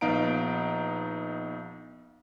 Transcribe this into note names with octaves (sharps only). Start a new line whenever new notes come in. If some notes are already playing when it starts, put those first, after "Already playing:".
A#1 B3 D#4 F5 A#5 D7